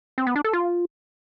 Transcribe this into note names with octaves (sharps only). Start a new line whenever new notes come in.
C4
B3
D4
A4
F4